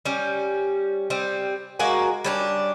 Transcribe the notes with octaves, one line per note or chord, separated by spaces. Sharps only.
G3 C#4
G3 C4
G#3 A#3 F#4 G#5
G3 C#4 D4